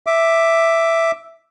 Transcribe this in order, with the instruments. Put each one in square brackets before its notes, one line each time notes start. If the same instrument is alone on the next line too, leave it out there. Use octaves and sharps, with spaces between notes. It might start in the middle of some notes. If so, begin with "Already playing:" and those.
[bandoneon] E5 D6